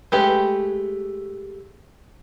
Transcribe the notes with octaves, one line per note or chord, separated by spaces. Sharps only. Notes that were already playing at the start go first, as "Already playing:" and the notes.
G#3 A3 G4 B4